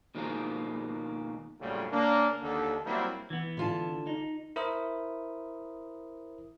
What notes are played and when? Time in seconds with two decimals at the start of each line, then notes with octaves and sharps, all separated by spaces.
0.15 B2 D#3 F3 G3 G#3 A#3
1.61 A#1 F#2 A2 C#3 G3 F4
1.92 C#3 A#3 D4
2.42 D#2 D3 A4
2.85 F#3 G3 A#3 C4 E4
3.30 E3 B3
3.57 D3 F4 A5
4.07 D#4
4.56 E4 A#4 C5 E5 D#6